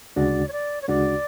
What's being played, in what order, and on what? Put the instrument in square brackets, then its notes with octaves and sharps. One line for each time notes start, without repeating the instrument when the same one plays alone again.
[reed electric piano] D2 C#3 G#3 D4 F#4 [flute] D5
[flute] C#5
D5
C#5
[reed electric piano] D2 C#3 G#3 D4 F#4 [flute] D5